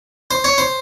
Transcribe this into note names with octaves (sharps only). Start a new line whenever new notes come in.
C5
C#5
C5